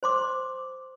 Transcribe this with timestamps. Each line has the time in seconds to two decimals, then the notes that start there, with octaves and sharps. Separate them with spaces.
0.03 C5 C6 D6